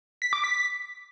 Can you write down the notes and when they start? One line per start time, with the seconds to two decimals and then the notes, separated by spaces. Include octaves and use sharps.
0.22 B6
0.33 D6
0.44 B6